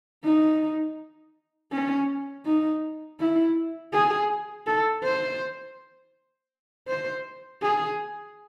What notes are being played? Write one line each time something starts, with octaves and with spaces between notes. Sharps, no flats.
D#4
C#4
D#4
E4
G#4
A4
C5
C5
G#4